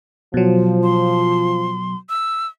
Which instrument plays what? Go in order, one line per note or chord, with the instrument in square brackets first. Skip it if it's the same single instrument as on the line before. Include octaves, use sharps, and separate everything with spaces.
[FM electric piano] B2 F#3 [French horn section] F3
[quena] C6
E6